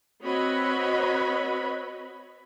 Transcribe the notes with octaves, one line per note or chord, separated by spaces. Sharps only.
C4 F#4 B4 C#5 D#5 B5